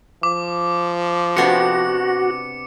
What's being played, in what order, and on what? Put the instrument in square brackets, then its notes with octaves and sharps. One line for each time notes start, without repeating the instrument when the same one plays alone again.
[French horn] F3 [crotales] D6
[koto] C3 B3 D4 [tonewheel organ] F#4 [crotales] C#7